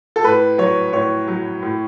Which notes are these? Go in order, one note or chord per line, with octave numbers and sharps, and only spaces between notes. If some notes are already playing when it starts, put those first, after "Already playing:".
A4
A2 B4
F#3 C#5
A2 C#5
F#3
A2